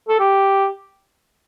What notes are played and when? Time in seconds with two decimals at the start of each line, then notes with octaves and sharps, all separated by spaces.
0.09 A4
0.20 G4